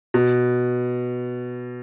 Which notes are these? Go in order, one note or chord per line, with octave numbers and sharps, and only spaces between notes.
B2